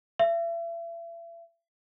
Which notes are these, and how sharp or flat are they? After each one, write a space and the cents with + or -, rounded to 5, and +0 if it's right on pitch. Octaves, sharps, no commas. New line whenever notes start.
E5 +35